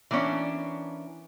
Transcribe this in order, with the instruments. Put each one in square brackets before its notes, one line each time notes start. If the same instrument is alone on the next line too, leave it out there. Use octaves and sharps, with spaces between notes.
[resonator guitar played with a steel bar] E3 A#3 B3 C#4 D4